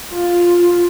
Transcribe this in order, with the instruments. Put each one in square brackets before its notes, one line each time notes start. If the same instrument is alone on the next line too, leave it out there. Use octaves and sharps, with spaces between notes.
[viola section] F4